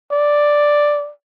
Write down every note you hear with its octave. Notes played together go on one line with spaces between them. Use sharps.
D5